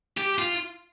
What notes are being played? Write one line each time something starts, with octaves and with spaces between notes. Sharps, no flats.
G4
F4